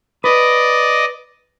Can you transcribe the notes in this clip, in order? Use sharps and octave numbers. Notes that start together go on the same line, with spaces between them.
B4 D5 D#5